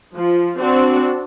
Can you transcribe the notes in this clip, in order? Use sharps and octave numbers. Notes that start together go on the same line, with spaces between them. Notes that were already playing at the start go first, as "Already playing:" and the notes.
F3
C4 D4 F#4